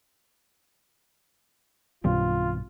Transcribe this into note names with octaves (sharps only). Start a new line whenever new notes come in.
B1 G2 B2 D#3 G3 C4 F4